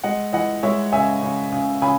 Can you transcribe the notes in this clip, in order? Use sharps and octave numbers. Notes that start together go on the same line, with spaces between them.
G#3 D#5 F#5
E3 D#5 F#5
G#3 C#5 E5
C#3 E5 G#5
C#3
C#3
C#3 G#5 B5